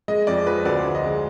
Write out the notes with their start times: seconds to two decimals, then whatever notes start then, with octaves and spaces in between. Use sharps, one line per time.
0.08 G#3 D#5
0.27 F2 D5
0.47 F3 B4
0.65 D2 D5
0.85 D2
0.95 D#5
1.04 G#3